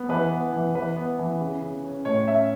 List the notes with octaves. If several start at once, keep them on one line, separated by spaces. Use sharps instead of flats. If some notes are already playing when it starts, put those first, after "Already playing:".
Already playing: B3
E3 B4
B3
E3
E3 B4
B3
E3
C#3
C#3
C#4
A2 C#5
C#4 E5